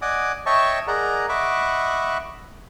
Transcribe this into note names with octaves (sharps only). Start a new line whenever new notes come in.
D5 D#5 F#5 G#5 D6 D#6
C#5 D#5 E5 G5 A5 C#6
G#4 A#4 D5 D#5 F#5 A#5
D#5 E5 F#5 B5 C#6 D6